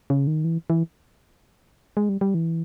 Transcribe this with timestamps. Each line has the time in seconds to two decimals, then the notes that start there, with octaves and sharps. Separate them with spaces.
0.10 C#3
0.27 D#3
0.44 E3
0.70 E3
1.97 G#3
2.09 G3
2.21 G3
2.34 E3